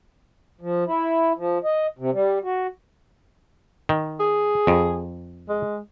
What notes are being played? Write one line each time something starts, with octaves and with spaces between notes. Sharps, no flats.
F3
E4
F3
D#5
C3
G3
F#4
D#3
G#4
F2
G#3